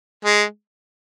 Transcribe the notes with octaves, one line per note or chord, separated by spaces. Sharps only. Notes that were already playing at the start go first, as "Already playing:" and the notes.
G#3